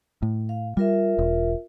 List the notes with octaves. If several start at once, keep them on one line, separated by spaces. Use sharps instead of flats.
A2
F5
G3 F4 A#4 E5
E1